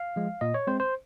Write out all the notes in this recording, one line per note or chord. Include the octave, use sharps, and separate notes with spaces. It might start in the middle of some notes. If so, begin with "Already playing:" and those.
Already playing: F5
F3 G#3
A#2 D#5
C#5
G#3 C4 C5
C5